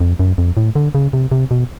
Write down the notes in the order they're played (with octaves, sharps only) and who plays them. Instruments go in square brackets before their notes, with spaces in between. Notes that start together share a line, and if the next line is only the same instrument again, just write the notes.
[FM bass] F2
F#2
F2
A2
D3
C#3
C3
C3
B2